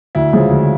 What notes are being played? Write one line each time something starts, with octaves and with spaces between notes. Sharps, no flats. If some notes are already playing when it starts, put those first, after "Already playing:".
D2 E4
C#3 F3 G#3
D2